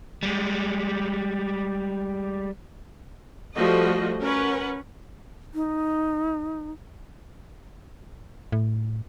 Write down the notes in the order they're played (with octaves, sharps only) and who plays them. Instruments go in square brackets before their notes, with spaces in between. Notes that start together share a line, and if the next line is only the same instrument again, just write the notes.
[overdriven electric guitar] G3 G#3
[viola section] F3 G3 A3 F#4 D#5
C#4 A#4 B4 F#5
[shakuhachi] D#4
[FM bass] A2